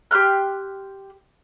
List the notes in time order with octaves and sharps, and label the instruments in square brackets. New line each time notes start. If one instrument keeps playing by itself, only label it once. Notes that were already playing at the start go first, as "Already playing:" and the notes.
[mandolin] G4 C6 F6 F#6